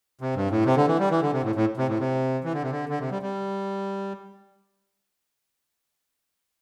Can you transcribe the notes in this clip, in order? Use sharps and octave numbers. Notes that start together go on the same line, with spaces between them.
C3
G2
A2
C3
D3
E3
G3
E3
D3
C3
A2
A2
C3
A2
C3
E3
D3
C3
D3
D3
C3
G3
G3